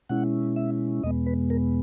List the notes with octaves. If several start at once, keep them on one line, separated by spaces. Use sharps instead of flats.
B2 G#3 C#4 E4 F#5
E5
E2 B2 G#3 B3 D#5
B4
A#4